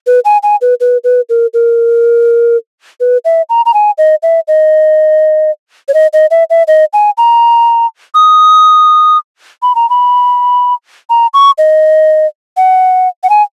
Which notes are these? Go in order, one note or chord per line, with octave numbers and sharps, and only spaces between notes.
B4
G#5
G#5
B4
B4
B4
A#4
A#4
B4
E5
A#5
A#5
G#5
D#5
E5
D#5
C#5
D#5
D#5
E5
E5
D#5
G#5
A#5
D#6
B5
A#5
B5
A#5
C#6
D#5
F#5
F#5
G#5